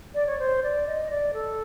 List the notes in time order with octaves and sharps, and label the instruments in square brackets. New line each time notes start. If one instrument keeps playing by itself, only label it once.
[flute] D5
C#5
C5
D5
D#5
D5
A4